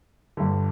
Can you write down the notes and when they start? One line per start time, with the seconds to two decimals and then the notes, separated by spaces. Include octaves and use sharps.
0.37 G1 G2 D3